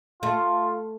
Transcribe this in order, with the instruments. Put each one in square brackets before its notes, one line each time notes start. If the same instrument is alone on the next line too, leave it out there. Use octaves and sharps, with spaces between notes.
[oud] A3 [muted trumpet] F4